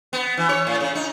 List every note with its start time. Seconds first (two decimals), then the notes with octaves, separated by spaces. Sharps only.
0.13 B3
0.37 E3
0.49 C#5
0.67 A2
0.81 C#3
0.95 D#4